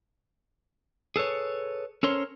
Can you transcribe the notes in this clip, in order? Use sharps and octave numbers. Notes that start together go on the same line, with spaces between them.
G#4 A4 B4 C#5
C#4 A4 A#4 C5 C#5 C6